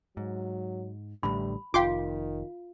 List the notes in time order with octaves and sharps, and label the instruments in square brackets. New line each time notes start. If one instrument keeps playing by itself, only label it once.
[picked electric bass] G#2 [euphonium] F#3
[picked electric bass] A1 A2 D3 [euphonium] G3 [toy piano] B5
[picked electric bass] F1 [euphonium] D#3 [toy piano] F4 F5 [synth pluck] G5 C6 D6